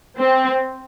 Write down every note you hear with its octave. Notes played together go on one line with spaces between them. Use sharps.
C4